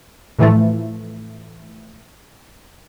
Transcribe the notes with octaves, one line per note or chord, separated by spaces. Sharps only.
A2 E3 F3 A3